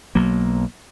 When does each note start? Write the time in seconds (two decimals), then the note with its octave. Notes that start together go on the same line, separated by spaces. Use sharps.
0.15 B1 F#3 A#3